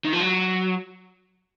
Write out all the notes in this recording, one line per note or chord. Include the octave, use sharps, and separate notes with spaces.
D#3
F3
F#3